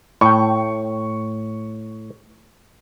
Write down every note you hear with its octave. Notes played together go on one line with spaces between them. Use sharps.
A2 G5 C#6